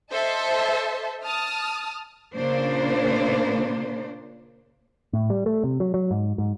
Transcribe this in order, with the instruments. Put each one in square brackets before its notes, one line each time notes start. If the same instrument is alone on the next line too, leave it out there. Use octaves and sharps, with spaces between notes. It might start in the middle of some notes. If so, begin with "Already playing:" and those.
[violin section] A4 C5 D#5 E5 A5
A5 D#6 F6
[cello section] A#2 C#3 A#3 D4 C5
[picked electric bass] A2
G3
A3
C3
F#3
F#3
G#2
G#2